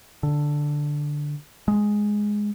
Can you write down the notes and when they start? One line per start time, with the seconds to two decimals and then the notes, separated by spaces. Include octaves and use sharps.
0.23 D3
1.68 G#3